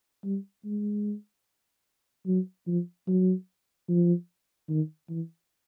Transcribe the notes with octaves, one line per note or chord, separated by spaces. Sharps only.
G3
G#3
F#3
F3
F#3
F3
D#3
E3